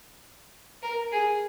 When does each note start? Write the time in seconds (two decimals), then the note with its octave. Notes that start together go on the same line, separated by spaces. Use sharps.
0.83 A#4
1.12 G#4